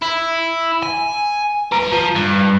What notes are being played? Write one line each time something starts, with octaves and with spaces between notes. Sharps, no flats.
E4
G#5
B4 A#5
F3
G2